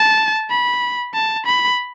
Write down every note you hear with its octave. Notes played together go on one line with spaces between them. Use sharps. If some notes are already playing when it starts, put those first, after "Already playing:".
Already playing: A5
B5
A5
B5